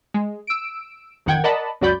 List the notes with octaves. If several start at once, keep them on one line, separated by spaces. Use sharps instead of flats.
G#3
E6 D7
A1 F2 D#3 F#5 G5 G#6
A#4 D5 D#5 F#5 A5 B5
C#2 F#2 F#4 D5 B5 G6